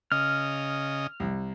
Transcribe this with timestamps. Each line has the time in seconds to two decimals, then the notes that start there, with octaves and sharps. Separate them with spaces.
0.12 C#3 D#5 F6
1.20 C2